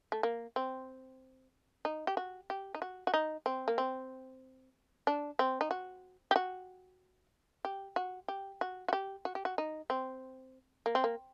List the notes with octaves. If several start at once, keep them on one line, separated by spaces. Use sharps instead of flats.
A3
A#3
C4
D#4
G4
F#4
G4
D#4
F#4
F#4
D#4
C4
A#3
C4
D4
C4
D#4
F#4
G4
F#4
G4
F#4
G4
F#4
F#4
G4
F#4
G4
F#4
D#4
C4
A#3
C4
A#3